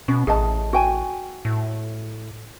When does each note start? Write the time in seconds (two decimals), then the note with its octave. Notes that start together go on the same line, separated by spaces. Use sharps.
0.08 B2 C#4
0.27 A1 G#4 D#5 A5
0.73 F#4 G5 G#5
1.45 A2